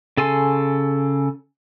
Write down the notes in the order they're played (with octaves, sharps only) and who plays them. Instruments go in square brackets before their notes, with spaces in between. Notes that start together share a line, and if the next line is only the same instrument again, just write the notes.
[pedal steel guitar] C#3 A4 G#5 C6